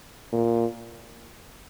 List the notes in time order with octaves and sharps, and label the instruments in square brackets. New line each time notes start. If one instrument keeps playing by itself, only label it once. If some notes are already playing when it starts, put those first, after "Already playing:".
[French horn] A#2